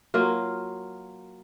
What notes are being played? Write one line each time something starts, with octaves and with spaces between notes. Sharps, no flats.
F#3 A#3 F4